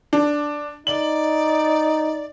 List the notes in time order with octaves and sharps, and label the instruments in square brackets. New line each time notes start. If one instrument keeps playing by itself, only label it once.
[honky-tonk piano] D4
[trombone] D#4 [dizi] D5 [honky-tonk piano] F#7